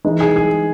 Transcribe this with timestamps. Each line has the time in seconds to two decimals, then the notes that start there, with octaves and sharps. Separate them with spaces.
0.05 E3 G#3 D#4
0.20 G#4
0.36 G#4